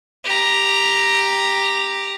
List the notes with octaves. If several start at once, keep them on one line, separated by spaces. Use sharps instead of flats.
G4 A#5